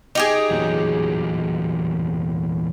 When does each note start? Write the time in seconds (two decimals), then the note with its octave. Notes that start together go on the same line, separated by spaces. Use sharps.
0.15 D#4 G4 G#4
0.51 E2 A#2 F#3